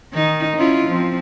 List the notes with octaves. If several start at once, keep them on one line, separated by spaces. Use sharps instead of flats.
D#3 D#4
C#4 E4 F4
F3 C4